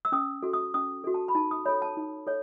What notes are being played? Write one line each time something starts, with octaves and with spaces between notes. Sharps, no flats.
E6
C#4 D#6
F#4 A4
D#6
C#4 D#6
F#4 A4
A5
B5
D#4 A5
D#6
A4 C#5 B5
A5
D#4
A4 C#5